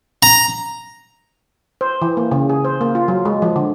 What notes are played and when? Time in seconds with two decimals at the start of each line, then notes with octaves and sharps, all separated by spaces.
0.23 A#5
1.81 C5
2.02 E3
2.17 A#3
2.31 C#3
2.50 G#4
2.65 C5
2.81 A#3
2.95 F4
3.08 F#3
3.25 G#3
3.42 F3
3.56 D3